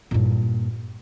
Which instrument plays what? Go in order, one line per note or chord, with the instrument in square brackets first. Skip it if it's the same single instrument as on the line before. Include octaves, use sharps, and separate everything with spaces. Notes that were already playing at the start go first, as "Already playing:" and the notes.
[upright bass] G2 A#2